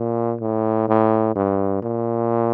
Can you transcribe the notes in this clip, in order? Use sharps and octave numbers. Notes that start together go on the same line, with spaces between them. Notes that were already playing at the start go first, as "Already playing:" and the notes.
Already playing: A#2
A2
A2
G2
A#2